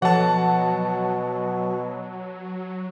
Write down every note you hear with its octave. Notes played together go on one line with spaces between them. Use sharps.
B2 F3 F#3 A4 F#5 A5